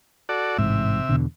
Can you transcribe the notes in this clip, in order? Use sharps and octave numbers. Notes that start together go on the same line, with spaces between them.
F#4 A4 D5
A1 G#2 C3 E5
E2 B2 D3